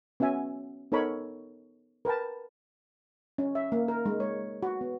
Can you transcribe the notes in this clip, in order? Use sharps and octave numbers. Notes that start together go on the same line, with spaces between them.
B3 C#4 F#4 E5 G#5
B3 D#4 A4 A#4 C#5 B5
A#4 B4 G5 A5
C#4
E5
A#3
A#4
G#3
C#5
F#4
B3